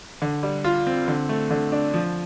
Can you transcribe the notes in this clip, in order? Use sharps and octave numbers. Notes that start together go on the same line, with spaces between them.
D3
G3
F4
C4
D3
A3
D3
D4
F3